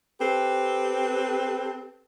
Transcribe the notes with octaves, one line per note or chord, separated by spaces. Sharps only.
C4 G4 A4 B4